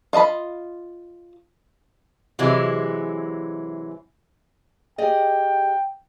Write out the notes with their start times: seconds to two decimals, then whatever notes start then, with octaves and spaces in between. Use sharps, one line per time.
0.13 F4 D#5 A5 B5
2.39 C3 E3 F#3 G#3 E4
4.98 G4 G#4 D#5 G5